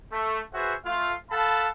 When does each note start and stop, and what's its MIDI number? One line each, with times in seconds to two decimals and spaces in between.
0.12 0.40 57
0.53 0.74 66
0.53 0.74 68
0.53 0.74 71
0.53 0.74 72
0.53 0.74 76
0.53 0.74 78
0.85 1.13 57
0.85 1.13 65
0.85 1.13 77
1.31 1.68 69
1.31 1.68 77
1.31 1.68 78
1.31 1.68 81
1.31 1.68 83